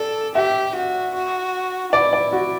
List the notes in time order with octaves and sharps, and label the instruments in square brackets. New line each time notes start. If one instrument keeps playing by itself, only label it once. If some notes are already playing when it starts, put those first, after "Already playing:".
Already playing: [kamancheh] A4 [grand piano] D5
[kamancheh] G4 [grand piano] E5
[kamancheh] F#4
F#4
[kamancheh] E4 [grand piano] D5
[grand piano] D5
F#4